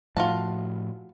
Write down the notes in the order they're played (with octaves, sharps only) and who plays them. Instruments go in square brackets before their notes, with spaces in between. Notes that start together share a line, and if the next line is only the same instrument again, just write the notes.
[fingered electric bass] A2 F3 [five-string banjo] F4 F#4 A5